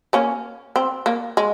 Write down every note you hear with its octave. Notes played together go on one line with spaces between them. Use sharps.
A#3 C#4
C4
A#3
G#3